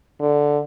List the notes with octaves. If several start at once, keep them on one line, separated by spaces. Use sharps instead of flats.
D3